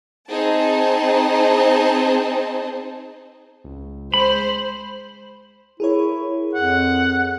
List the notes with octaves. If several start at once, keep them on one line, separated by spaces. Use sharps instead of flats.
C4 D#4 G#4 A5
C#2
G#3 C5 B5
E4 G#4 A#4 C#5
F2 F#5